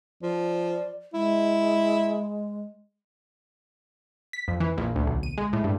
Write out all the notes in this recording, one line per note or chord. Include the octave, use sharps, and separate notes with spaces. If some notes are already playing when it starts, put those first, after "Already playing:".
F3 D5
G#3 E4
B6
F2
E3
A#1
D2
B1
D#7
G#3
A2
G2